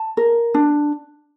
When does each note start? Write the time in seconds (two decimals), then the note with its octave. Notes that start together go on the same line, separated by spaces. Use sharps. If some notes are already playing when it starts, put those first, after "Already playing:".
Already playing: A5
0.17 A#4
0.54 D4